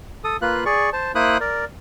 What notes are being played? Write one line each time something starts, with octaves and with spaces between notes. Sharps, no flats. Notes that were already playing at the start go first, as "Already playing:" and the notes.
A4 D#6
A#3 F4 B4 F#6
G#4 D5 C#6
C5 A5
A#3 E4 C5 B5 D#6 F#6
A#4 D5